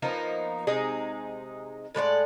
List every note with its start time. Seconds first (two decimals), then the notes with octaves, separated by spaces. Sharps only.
0.02 F3 A#3 B3 D#4
0.67 C3 G#3 D#4 G#4
1.95 A2 G#3 D5 F#5